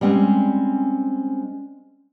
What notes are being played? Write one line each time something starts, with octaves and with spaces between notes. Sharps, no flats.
G3 G#3 C4 C#4